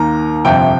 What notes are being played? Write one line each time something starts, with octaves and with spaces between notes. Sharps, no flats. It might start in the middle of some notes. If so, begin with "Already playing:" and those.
Already playing: D#2 D#3 A#3 A#5
G1 F2 C3 G5